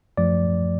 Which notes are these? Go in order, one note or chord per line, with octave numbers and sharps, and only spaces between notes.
F#2 F3 A3 D5